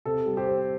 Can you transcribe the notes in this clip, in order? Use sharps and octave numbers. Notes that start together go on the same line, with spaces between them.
C3 A4
G3
G4 C5
C4